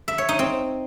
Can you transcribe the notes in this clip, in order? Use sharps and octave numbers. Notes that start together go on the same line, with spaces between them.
E5
C#5
D#4
C4